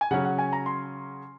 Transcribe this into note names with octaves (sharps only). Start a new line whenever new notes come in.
G#5
C#3 F#3 C#4 F#5
F#5
G#5
A#5
C6